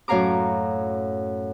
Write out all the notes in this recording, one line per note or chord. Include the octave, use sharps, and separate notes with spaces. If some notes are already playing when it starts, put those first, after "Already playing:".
F#2 A2 C#5 F5 A#5 D6